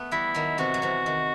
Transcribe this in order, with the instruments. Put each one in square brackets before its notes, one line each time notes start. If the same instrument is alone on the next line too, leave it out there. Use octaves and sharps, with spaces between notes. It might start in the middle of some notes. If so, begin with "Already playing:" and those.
Already playing: [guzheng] A3 B3
[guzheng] E3 G3 [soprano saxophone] E4
[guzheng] D#3 F#3
[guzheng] C3 E3 [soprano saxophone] F#4
[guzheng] F#3
C3 E3
D#3